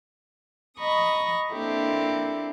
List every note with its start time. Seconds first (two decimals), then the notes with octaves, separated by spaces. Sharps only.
0.78 D#5 A#5 B5 C#6 D#6
1.50 A#3 C4 D4 E4 G4 A4